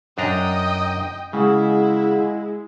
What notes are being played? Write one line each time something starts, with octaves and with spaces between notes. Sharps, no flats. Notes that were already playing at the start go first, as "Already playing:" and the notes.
F#2 D4 D#5 G5 A#5
C#3 G#3 E4 G#4 F5 F#5